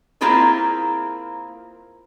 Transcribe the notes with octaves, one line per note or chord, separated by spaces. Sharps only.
A#3 C4 E4 F4 G#4 A#4